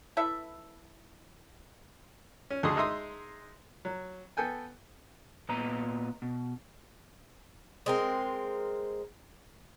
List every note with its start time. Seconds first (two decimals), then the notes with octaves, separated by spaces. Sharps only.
0.17 E4 A4 B4 E5
2.50 C#4
2.63 D2 D3 G#4 D#5 C6 D#6
2.76 G#3 D#4 E5 C6 D#6
3.85 F#3
4.37 B3 A4 G5 G#5
5.49 A#2 B3 D#5 A#5
6.22 B2
7.86 G#3 C4 A#4